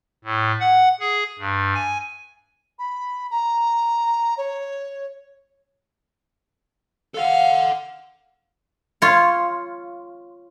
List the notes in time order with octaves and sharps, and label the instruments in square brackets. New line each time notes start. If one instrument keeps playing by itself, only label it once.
[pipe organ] A2
F#5
G#4
G2
G#5
[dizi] B5
A#5
C#5
[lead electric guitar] A4 F#5 [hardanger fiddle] F5
[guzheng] F4 C#5